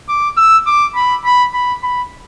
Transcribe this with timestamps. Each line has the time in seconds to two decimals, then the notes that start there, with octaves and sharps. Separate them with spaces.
0.09 D6
0.37 E6
0.66 D6
0.95 B5
1.25 B5
1.54 B5
1.83 B5